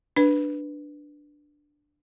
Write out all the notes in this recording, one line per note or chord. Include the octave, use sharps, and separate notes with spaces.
D4 B4